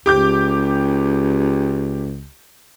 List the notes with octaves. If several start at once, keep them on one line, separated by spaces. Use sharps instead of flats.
C#2 G4 D6 G6